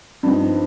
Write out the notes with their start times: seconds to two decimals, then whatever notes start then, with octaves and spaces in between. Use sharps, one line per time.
0.23 G2 F3 C4 D#4